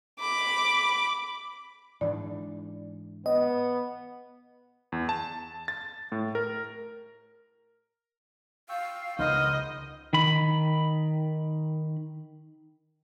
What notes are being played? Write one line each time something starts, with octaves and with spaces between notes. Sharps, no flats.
B5 D6
G#2 E3 D4 D5
B3 D#5
E2
A5
A6
A2
A#4
F5 G5 C#6 E6
C#2 B3 D#4 A#4 C5 D#5
D#3 B5